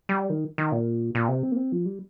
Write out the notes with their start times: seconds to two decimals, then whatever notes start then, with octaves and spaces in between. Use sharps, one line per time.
0.09 G3
0.30 D#3
0.58 D#3
0.72 A#2
1.15 A#2
1.28 C3
1.43 C4
1.52 A#3
1.56 C4
1.72 F3
1.86 G3